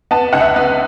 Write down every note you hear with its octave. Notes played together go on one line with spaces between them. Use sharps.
B3 A5
C#2 F#5
E5
B3